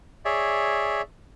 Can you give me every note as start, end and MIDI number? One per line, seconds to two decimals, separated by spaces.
0.25 1.02 68
0.25 1.02 73
0.25 1.02 74
0.25 1.02 76